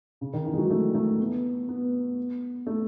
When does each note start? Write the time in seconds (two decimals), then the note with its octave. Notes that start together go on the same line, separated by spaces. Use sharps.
0.21 C#3
0.33 D#3
0.46 E3
0.54 G#3
0.58 F#3
0.70 A3
0.95 A3
1.19 B3
1.69 B3
2.67 A3